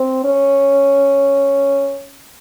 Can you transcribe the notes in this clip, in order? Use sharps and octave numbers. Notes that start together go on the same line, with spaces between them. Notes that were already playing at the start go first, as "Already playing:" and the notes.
Already playing: C4
C#4